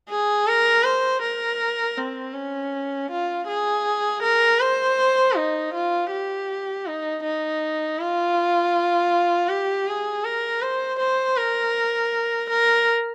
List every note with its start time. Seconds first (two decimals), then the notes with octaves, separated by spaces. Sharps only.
0.09 G#4
0.47 A#4
0.84 C5
1.22 A#4
1.98 C4
2.34 C#4
3.10 F4
3.48 G#4
4.23 A#4
4.60 C5
5.36 D#4
5.74 F4
6.11 G4
6.87 D#4
7.23 D#4
7.99 F4
9.49 G4
9.87 G#4
10.24 A#4
10.61 C5
10.99 C5
11.37 A#4
12.50 A#4